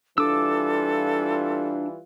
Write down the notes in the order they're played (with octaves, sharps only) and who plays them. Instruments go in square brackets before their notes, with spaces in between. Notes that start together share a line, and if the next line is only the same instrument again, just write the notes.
[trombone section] E3 G3 F4 [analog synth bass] D4 [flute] A4 [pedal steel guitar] D6 E6